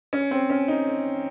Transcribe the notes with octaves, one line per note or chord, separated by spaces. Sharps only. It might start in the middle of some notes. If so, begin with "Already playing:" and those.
C#4
C4
C#4
D#4